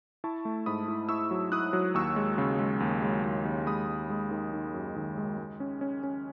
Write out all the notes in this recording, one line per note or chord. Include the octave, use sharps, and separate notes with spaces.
E4 A5 C#6
A3
G#2 B5 D#6
E4
E4 C#6 E6
F#3
E4 D#6 F#6
F#3
D#2 C#6 E6
G#3
C#3
G#3
D#2
G#3
D#2
D#2
G#3 B5 D#6
G#3
G#3
D#3
D#3
F#2
D#3
G#3
G#3
C#4
C#4
C#4